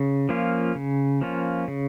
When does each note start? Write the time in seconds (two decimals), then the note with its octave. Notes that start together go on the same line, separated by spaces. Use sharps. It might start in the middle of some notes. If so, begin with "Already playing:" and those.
Already playing: C#3
0.29 F3 A#3 C#4 F4
0.75 C#3
1.21 F3 A#3 C#4 F4
1.68 C#3